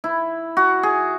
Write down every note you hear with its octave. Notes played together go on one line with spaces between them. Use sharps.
E4
F#4
G#4